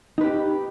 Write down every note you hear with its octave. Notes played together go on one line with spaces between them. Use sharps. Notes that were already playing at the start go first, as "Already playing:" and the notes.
D#4 G4 B4